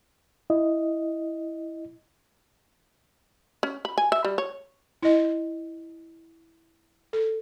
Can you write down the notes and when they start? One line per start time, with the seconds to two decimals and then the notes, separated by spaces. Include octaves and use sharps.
0.50 E4 D#5
3.63 C#4
3.85 B5
3.98 G#5
4.12 E5
4.25 G3
4.38 C#5
5.03 E4 D#5
7.13 A4